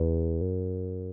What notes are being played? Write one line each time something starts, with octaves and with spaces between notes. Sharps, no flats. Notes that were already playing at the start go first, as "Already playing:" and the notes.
Already playing: E2
F#2